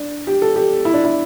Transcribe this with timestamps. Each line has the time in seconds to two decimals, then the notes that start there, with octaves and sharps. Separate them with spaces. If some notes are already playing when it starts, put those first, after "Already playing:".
Already playing: D4
0.27 G4
0.42 A4
0.56 G4
0.85 E4
0.94 D4
1.05 E4